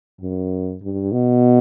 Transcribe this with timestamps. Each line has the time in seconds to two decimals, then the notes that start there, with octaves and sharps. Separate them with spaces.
0.21 F#2
0.82 G2
1.12 B2